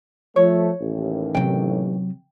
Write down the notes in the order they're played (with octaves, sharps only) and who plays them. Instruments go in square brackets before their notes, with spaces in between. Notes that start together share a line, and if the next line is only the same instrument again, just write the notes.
[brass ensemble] F3 A3 [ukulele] C#5
[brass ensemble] A1 D#2
[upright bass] C3 F#3 [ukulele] G5